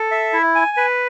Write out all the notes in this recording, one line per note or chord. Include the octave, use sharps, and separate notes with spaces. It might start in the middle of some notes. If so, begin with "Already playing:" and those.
Already playing: A4
E5
E4
G#5
B4